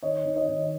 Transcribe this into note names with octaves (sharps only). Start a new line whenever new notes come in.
D#3 C#5 D#5
D#3
C#5 D#5
D#3